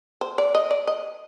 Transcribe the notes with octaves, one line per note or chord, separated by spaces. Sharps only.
C5
D5
D#5
D5
D#5